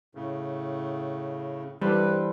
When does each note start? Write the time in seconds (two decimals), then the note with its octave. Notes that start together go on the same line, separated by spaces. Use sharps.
0.15 A2 C#3
1.81 G2 E3 G3 A4 B4 C5